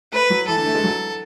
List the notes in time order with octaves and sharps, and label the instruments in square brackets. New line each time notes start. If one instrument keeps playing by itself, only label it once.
[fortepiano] A3 [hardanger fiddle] B4
[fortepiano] F#3
[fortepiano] E3 [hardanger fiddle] A4
[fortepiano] D3
A3
G#3
F#3